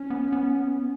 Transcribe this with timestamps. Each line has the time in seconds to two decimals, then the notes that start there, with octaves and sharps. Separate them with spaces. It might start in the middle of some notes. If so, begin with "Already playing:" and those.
Already playing: C#4
0.10 B3
0.32 B3